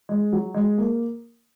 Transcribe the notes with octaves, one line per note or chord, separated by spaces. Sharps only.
G#3
F#3
G#3
A#3